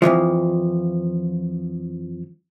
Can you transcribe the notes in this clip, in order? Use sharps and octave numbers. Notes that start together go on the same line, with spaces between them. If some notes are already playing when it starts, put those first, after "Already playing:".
F2 B2 E3 F3